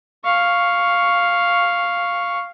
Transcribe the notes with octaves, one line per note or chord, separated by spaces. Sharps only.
F5 C#6